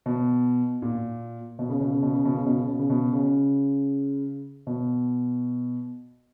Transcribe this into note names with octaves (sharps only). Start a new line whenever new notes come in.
B2
A#2
B2
C#3
B2
C#3
B2
C#3
B2
C#3
B2
C#3
B2
C#3
B2
C#3
B2